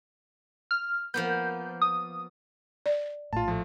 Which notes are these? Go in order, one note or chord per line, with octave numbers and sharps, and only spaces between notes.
F6
F3 A#3 B3 G6
D#6
D5
A#1 A2 F4 A5
F3 A3